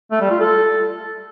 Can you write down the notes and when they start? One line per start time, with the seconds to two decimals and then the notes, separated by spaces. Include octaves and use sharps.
0.11 A3
0.21 G3
0.30 F4
0.40 A4